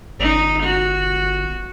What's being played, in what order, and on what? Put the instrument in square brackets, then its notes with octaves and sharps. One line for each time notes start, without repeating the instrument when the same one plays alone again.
[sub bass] G1 [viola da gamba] D#4
[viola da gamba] F#4